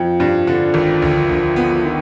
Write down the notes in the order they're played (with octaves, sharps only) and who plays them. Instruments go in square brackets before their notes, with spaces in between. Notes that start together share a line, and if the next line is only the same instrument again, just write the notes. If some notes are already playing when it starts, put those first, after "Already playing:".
Already playing: [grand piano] F2 [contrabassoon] F3
[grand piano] G2
D3
G#1
D2
D2
B3
[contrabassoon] D#3